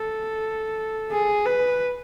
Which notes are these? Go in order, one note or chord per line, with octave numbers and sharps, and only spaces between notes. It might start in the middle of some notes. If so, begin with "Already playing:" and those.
Already playing: A4
G#4
B4